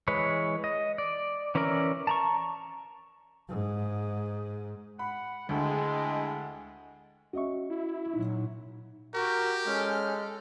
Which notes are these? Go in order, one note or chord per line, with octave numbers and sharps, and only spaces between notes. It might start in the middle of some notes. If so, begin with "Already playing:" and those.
E3 G#3 B4 C#5
D#5
D5
E3 C#4 E4 A#4 D5
A5 A#5 C#6
G#2
F#5 B5
D2 G#3 D4 E4 G5
C#4 F#4 D#5 E5 C#6
E4
A#2 F#3 D#4
F#4 G4 A#4
G#3 C#4 A4 F6